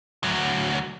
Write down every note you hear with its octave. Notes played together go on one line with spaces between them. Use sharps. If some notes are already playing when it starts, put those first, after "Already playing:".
D2 F#3